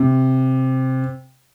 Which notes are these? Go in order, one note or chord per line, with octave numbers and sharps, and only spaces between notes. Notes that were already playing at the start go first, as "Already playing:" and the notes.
Already playing: C3